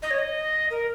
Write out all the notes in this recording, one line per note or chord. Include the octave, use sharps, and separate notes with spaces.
D#5
C#5
D#5
A#4